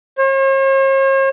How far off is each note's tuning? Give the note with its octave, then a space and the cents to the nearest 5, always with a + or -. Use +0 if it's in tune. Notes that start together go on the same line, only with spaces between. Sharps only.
C#5 -45